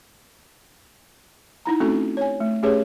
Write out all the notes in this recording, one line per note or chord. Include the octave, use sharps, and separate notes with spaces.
D#4 E4 A#5
A3 C4 C#4 D#4 F#4 A4
C#5 G#5
A3
A3 C#4 G4 G#4 B4 C#5